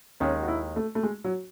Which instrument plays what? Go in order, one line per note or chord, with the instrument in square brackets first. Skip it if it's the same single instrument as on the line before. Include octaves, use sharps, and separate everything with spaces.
[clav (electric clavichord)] D#2 D#3 G#3 [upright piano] C#4
[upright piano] F#4
E4
A3
A3
G#3
F#3